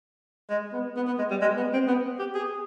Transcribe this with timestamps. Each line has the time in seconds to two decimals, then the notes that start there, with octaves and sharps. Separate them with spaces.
0.50 G#3
0.73 B3
0.96 B3
1.07 B3
1.19 G#3
1.31 G3
1.42 G#3
1.57 B3
1.73 C4
1.88 B3
2.19 G4
2.35 G#4